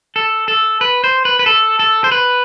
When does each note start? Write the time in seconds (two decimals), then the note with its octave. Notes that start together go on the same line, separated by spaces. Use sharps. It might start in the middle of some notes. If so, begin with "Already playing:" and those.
0.16 A4
0.48 A4
0.81 B4
1.04 C5
1.25 B4
1.39 B4
1.46 A4
1.79 A4
2.04 C5
2.12 B4